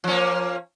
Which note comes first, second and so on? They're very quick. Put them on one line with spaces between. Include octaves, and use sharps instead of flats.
F3 C#4 A#3